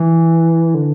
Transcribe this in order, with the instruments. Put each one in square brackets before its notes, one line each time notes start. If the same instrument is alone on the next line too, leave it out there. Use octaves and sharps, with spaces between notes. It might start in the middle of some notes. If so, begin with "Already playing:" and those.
Already playing: [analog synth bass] E3
D3